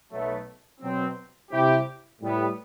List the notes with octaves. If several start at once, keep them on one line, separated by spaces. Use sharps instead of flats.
B1 B2 F#3 A3
B2 F#3 C4
C3 G3 C4 E4 G4
A2 G3 B3